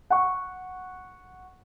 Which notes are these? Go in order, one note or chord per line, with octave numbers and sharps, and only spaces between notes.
F#5 C#6